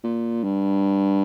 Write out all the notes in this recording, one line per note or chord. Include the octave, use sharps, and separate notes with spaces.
A#2
G2